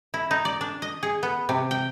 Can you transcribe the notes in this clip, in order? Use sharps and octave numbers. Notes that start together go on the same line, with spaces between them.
E4
D#4
D5
D4
D#5
G#4
B3
C3
G5